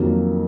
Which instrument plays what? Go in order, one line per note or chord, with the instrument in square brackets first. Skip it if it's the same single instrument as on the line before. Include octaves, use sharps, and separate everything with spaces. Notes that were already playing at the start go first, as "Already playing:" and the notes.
Already playing: [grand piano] F2 D#3 F#3 A#3